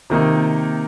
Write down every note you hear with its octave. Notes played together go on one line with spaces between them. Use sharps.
C3 D#3 A#3 D#4